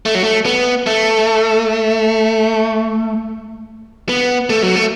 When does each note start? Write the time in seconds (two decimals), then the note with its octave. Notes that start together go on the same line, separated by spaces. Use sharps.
0.06 A3
0.15 F#3
0.24 A3
0.46 B3
0.87 A3
4.09 B3
4.50 A3
4.63 F#3
4.76 A3